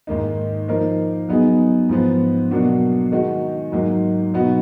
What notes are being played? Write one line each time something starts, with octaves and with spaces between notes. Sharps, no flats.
G#2 D#3 A#3 D#4
F3 A#3 D#4 A#4
F#3 B3 D#4 G#4
G#2 F3 B3
B2 F#3 A#3 D4 F#4
D#3 G#3 D#4 F#4
G#2 F#3 A#3 D#4
B2 F#3 B3 D#4 F#4